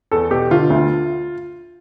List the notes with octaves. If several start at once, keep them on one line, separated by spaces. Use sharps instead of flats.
E2 A4
B2 G4
D3 F4
D2